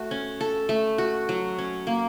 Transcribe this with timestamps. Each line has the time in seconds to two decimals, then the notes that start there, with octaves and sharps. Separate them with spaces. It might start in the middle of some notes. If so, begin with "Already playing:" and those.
Already playing: A3 F#4
0.11 C#4
0.41 A4
0.69 A3
0.98 F#4
1.29 F#3
1.58 C#4
1.87 A#3